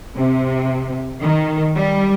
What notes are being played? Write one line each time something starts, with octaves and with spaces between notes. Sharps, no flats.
C3
D#3
G3